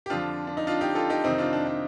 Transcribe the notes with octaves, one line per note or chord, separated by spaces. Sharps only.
G4
F2 D3 F3 D4 F4
D4
D#4
D4 F4
D#4 G4
F4 A4
D#4 G4
F2 C3 D#3 C4 D#4
D4 F4
D4
D4